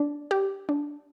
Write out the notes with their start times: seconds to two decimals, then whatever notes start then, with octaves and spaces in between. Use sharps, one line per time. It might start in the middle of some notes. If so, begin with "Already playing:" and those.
Already playing: D4
0.31 G4
0.69 D4